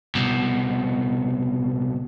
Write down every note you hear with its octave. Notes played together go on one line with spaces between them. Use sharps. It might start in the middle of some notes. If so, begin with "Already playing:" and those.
C2 B2